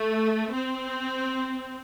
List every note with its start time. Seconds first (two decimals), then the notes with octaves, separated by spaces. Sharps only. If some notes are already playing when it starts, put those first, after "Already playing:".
Already playing: A3
0.52 C4